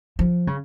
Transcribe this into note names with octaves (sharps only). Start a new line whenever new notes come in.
F3
C#3